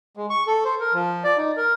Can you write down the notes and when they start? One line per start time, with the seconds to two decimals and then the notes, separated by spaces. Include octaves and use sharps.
0.17 G#3
0.30 C#6
0.47 A4
0.65 C5
0.80 A#4
0.93 F3
1.24 D5
1.38 D#4
1.57 A#4